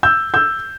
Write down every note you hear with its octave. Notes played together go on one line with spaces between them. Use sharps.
E6 G6
E6 G6